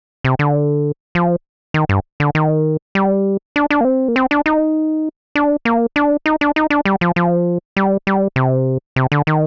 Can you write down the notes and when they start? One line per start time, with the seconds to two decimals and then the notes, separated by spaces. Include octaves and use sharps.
0.25 C3
0.39 D3
1.15 F3
1.74 D#3
1.89 G2
2.20 D3
2.35 D#3
2.95 G3
3.56 D4
3.70 D4
3.81 A#3
3.85 C4
4.08 A#3
4.16 C4
4.31 D4
4.46 D#4
5.35 D4
5.65 A#3
5.96 D4
6.26 D#4
6.41 D4
6.56 D#4
6.70 D4
6.85 G3
7.01 F3
7.16 F3
7.76 G3
8.07 G3
8.36 C3
8.96 C3
9.12 D3
9.27 D#3